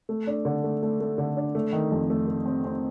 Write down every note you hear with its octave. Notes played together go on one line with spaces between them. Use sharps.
A3
D4
D3
A3
A3
A3
D3
D4
A3
D#3
F2
A3
A3
C4
C4